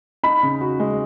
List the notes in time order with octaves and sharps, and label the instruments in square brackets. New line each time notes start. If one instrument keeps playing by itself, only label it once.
[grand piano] D#4 [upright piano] B5
[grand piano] C#3
F#4
G#3